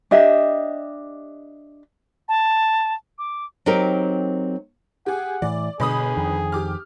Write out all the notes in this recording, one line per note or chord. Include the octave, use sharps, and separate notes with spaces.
D4 G4 D#5 E5
A5
D6
F#3 C4 D#4 G4 A#4
G4 G#4 F#5
A2 E3 D5
G1 B2 G#4 B5 D#6
F2 D#3
G4 D6 F6